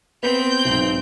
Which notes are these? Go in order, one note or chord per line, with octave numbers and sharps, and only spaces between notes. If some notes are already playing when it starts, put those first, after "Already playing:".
B3 C4 G6 B6
B1 G#2